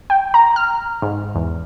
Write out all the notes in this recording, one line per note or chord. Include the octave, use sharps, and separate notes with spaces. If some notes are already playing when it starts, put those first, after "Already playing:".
G5
A#5
F6
G#2
E2